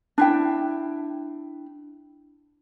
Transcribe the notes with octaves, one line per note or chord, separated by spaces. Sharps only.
D4 E4 G5